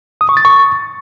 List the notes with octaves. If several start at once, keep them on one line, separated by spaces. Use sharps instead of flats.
D#6
C#6
A6
C#6